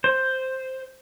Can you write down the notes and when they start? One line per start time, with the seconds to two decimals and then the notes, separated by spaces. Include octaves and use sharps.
0.04 C5